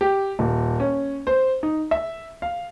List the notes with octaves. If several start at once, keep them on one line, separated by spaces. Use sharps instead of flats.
G4
D#1
C#4
C5
D#4
E5
F5